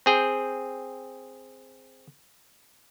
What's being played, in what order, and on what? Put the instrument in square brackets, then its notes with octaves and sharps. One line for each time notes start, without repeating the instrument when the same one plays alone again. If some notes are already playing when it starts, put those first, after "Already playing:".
[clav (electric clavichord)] C4 G#4 G5